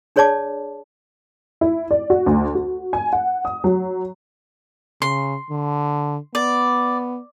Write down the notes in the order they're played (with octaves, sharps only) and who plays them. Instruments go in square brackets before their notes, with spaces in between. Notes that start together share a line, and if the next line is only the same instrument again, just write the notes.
[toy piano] D4 G#4 C#5 D5 A5 D6
[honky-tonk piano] E4
D5
F#4
D2
F#4
G#5
F#5
D#6
F#3
[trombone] C#3 [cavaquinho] C6
[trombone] D3
[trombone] B3 [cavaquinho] D5